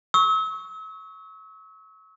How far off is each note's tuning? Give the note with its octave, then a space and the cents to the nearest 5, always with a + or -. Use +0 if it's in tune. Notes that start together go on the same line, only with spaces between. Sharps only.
C#6 +0 E6 -40